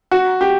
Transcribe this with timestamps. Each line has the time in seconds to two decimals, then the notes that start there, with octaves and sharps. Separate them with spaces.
0.11 F#4
0.41 G4